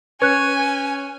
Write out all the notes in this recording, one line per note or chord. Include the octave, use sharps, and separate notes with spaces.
C#4 B4 C#5 G#5 F#6